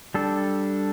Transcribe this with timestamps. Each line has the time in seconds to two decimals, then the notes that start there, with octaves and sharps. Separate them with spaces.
0.14 G3 D4 A4